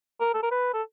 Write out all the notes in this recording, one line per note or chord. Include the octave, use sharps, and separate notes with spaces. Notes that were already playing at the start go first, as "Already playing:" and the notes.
A#4
A4
A#4
B4
A4